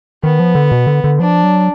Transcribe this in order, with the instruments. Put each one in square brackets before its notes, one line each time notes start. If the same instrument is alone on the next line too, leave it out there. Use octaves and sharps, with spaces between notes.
[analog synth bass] D#3 [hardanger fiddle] B3
[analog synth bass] F3
D3
B2
D3
D3
[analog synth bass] F3 [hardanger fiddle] D4
[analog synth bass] F#3